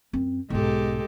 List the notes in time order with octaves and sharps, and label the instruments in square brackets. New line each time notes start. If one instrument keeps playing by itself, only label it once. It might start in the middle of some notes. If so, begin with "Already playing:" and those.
[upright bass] F#2 C4
[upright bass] B1 G#2 [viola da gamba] G#3 G4 A4